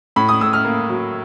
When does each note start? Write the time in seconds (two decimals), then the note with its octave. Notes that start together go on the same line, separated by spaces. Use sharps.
0.16 A2 B5
0.29 D#6
0.41 A2 E6
0.53 F6
0.65 A#3
0.90 F#3